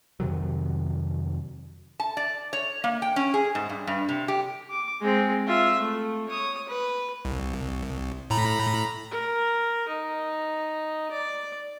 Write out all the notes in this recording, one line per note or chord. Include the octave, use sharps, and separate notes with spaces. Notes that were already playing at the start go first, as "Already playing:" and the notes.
F2 C3 D#3 F#3
A5
D5
C#5
A#3
G5
C#4
G#4
G#2
G2
G2
C3
G4
D6
G#3 C4
F4 E5
A3
C#5 D#6
B4
C2
A2 A#5 B5
A#4
D#4
D5